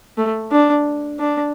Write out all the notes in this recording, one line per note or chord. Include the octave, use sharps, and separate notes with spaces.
A3
D4
D4